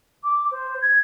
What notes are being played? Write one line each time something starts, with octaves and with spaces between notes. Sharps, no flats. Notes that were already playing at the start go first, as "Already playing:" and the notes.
D6
C5
G#6